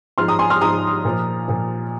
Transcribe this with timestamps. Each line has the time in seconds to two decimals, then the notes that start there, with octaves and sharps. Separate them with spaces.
0.18 G#2 F3 C6 F6
0.28 A#5 D#6
0.39 G#5 C6
0.50 C6 F6
0.61 G#2 F3 A#5 D#6
1.05 A#2 F3
1.48 A#2 F3